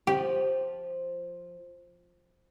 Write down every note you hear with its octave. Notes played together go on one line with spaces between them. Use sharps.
F3 G4